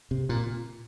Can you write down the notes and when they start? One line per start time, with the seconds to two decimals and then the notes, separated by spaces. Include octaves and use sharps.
0.11 C3
0.29 A#2